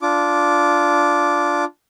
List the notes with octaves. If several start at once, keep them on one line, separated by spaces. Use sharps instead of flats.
D4 F4 D6